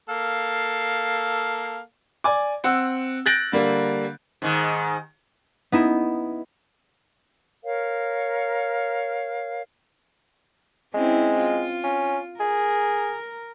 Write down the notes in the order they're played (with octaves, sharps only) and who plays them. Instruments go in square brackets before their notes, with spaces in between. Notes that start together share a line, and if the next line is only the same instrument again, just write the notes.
[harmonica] A#3 A4 F5
[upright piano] D5 G#5 D6
C4 F#5 E6
F#6 G6 A6 A#6 D7 F#7
D3 G3 A#3
[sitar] G#2 D#3
[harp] B3 D#4 E4
[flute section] A#4 C#5 F5
[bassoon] G#3 [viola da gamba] C4 C#4 E4
[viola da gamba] F4
[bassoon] C#4
[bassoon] G#4 [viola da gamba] A#4